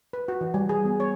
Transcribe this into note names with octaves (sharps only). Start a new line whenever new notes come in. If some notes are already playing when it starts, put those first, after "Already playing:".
B4
F#4
E3
G3
G#4
B3
C#5